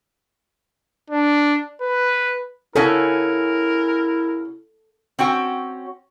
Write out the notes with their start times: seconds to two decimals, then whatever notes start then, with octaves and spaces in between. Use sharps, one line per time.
1.10 D4
1.81 B4
2.76 C#3 C#4 E4 F#4 A4 A#4
5.19 C4 C#4 F#4 G5